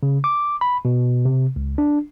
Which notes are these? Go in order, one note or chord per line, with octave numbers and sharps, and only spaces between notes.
C#3
D6
B5
B2
C3
C#2
D4